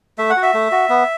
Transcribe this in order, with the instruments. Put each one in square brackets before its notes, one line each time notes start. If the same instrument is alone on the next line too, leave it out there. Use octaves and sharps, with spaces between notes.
[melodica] A3 E5
F#5
F#4
E5
A3
F#4
B3